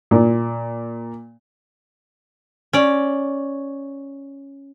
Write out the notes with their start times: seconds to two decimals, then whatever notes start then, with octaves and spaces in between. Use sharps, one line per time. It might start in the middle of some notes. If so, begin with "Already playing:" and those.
0.11 A#2
2.73 C#4 D5